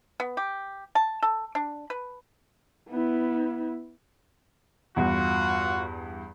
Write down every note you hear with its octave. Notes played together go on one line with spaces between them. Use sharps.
B3
G4
A5
A4
D4
B4
B3 E4
E2 G2 F4 F#4